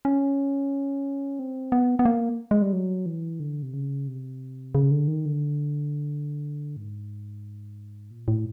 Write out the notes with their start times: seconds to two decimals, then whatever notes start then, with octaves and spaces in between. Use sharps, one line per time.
0.05 C#4
1.39 C4
1.72 B3
1.99 B3
2.05 A#3
2.51 G#3
2.62 G3
2.73 F#3
3.06 E3
3.40 D3
3.63 C3
3.74 C#3
4.07 C3
4.75 C#3
4.91 D3
5.08 D#3
5.26 D3
6.77 G#2
8.11 A#2
8.28 A2